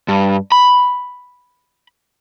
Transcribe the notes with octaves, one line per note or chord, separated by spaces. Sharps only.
G2
B5